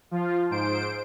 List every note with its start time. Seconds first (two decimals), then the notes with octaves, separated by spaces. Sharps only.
0.11 F3 F4
0.50 G#2 C5 D7